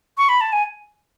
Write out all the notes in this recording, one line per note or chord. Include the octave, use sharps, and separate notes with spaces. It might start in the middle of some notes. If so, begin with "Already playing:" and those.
C#6
B5
A5
G#5